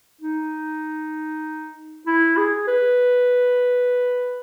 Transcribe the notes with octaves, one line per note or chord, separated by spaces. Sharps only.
D#4
E4
G#4
B4